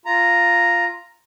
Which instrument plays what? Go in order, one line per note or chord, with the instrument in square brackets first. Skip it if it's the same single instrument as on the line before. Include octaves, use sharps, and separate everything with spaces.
[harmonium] F4 A#5